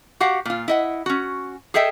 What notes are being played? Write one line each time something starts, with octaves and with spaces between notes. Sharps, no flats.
F#4 G4 F5 F#5
A#2 F4
E4 D#5 F#5
C#4 F#4
G#4 A4 D#5 E5 G5